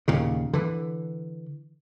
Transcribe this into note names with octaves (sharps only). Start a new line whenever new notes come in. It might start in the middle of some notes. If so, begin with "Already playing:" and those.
D#2 A#2 C#3
D3 E3